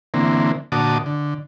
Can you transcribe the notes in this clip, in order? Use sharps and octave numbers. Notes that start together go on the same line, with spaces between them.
D3 E3 A#3 C4
A#2 D3 F#4 A5 D6 D#6
D3